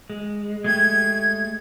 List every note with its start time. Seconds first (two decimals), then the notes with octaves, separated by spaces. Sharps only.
0.10 G#3
0.64 G#3 A3 G4 G#6